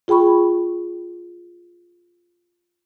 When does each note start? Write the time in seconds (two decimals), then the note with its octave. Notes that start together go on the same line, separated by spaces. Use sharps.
0.08 F4 G#4 G5 B5 C#6